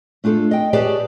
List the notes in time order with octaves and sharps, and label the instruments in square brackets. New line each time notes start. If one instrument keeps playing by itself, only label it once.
[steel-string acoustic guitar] A3 D4 F4 G#4 A4
D#5 G5
G4 G#4 B4 C#5 D5 A5